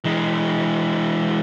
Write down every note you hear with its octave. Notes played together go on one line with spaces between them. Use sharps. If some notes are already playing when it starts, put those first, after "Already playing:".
E3 G#3